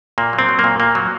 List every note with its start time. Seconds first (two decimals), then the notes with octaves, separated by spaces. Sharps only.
0.18 A#2 A#3
0.33 F#3
0.39 C4
0.49 F#3
0.59 A#3
0.64 A#2
0.80 A#2 A#3
0.95 F#3